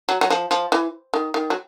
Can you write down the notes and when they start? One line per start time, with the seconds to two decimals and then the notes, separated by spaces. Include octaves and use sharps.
0.09 F#3
0.21 F#3
0.30 F3
0.51 F3
0.72 E3
1.14 D#3
1.34 D#3
1.50 F#3